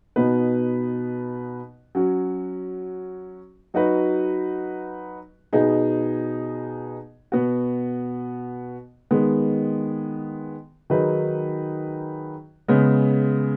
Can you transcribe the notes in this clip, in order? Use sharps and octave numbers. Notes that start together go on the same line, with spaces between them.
B2 B3 D#4 B4
F#3 C#4 F#4
F#3 D#4 F#4 B4
B2 B3 D#4 G#4
B2 B3 F#4
D#3 G#3 B3
D#3 F#3 D#4 G#4 B4
C#3 G#3 B3